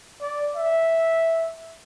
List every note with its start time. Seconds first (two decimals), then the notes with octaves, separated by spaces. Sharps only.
0.20 D5
0.56 E5